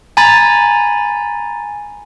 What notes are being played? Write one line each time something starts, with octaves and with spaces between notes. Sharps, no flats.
G#5 A#5 B5 A6